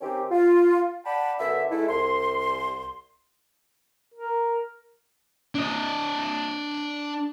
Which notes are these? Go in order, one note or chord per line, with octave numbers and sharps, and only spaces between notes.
D#3 C4 C#4 G4
F4
D5 F#5 G5 A5 B5
F#2 D3 B3 E5
G#3 A3 D#4 E4
C2 C6
A#4
D4 D#5